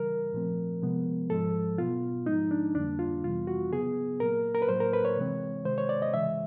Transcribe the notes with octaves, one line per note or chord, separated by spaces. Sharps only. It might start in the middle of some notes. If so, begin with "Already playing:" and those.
Already playing: C#3 E3 G3 A#4
A#2 F3 A3 C4
C3 F3 G#3 B3
G#2 F3 G#3 A4
B2 F#3 B3 F4
G#2 F3 G#3 D#4
D4
F2 D3 G3 A#3 D4
F4
F2 C3 E3 G3 B3 F4
F#4
C#3 F#3 B3 G#4
A#2 F#3 A#3 A#4
A#4
B4
A2 F#3 A#3 C5
A#4
B4
C#5
C3 E3 G#3 C4
C3 D#3 G#3 C5
C#5
D5
D#5
C#3 E3 G#3 E5